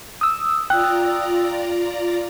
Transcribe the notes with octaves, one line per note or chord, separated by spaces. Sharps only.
D#6 E6
F4 D5 G5 A#5 F#6